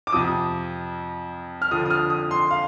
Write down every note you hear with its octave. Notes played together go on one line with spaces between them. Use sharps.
D6
F2 C3 F3 D#6
F6
F2 D3 F3 D#6
D#6
F6
D#6
C6
F5